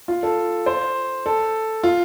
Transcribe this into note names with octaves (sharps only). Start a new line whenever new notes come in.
F4
A4
C5
A4
F4